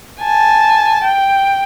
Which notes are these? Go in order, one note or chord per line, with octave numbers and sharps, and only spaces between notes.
G#5 A5
G5